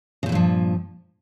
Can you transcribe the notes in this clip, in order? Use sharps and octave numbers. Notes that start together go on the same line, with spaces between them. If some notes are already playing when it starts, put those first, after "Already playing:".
E2 G2 A#2 C#3 F3